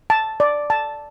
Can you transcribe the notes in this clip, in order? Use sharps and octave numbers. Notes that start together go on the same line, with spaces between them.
A5
D5
A5